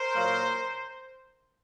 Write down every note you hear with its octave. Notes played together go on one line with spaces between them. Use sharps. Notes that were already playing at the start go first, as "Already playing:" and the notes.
Already playing: A#4 C5
A#2 F#3 A#3